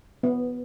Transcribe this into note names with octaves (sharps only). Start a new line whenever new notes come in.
B3